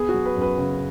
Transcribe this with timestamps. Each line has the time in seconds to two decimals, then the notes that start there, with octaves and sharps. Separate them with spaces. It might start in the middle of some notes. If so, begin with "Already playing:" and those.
Already playing: B3 G#4
0.09 F#4
0.14 F#3
0.26 B4
0.36 F#2
0.42 B4
0.58 C#3